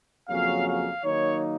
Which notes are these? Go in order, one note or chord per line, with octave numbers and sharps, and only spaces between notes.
F2 C#3 F#3 A#3 C#4 F5
F5
D#3 F#3 A#3 D#4 C#5